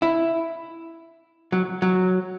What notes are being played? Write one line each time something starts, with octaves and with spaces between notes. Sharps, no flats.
E4
F#3
F#3